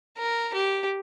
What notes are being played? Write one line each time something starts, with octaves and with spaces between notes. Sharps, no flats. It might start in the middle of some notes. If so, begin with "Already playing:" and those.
A#4
G4